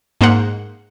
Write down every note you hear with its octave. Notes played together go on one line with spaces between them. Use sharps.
G#2 A#3 C5 F#5